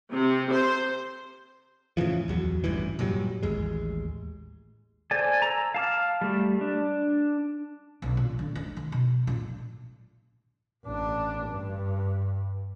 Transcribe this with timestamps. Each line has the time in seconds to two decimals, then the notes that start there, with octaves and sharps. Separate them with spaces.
0.11 C3
0.52 C5
1.97 A2 C#3 E3 F3
2.28 D1 E2 F#3
2.64 D#1 A1 G2 E3
2.99 G2 A#2 F#3 G3
3.43 A1 D#2 G#3
5.11 A4 C5 D5 G#5
5.42 A#5 E6
5.75 F5 A5 D6 F6
6.21 G3 A3
6.61 D4
8.02 B1
8.17 A#2
8.39 D3
8.55 D#4
8.77 D#3
8.92 B2
9.27 A#2
10.85 A1 D4
11.47 G2